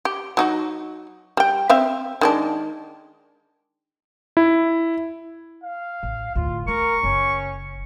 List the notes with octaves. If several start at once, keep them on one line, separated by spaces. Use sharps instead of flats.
G4
F#3 D#4 F#4
G3 G5
C4 E5 F5
D#3 G#3 D4
E4
F5
A1
D2 A2 F4
A3 A#4 C#6
F#1 C#4